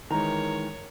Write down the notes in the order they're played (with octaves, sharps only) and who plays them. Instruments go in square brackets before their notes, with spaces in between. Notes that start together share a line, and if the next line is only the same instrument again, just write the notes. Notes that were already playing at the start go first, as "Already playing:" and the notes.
[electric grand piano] D#3 E3 G#3 [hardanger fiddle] A#4 C#5 [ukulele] A#5